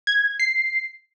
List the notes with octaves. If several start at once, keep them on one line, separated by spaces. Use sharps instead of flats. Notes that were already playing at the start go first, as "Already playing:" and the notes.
G#6
C7